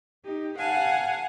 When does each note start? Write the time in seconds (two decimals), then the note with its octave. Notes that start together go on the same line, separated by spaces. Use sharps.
0.25 D#4 G4
0.58 F5 F#5 G#5 A5